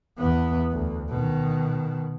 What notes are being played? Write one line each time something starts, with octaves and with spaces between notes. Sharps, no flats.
E2 B3
D2
B2 D#3